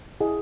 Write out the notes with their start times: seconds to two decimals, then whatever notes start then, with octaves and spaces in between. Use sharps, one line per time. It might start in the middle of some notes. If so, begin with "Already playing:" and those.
0.21 E4 G#4 D#5 F#5